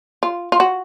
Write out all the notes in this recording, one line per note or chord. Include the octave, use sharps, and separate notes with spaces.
F4
F4
F#4